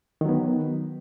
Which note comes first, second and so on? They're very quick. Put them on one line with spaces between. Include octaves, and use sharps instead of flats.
D#3 F#3 B3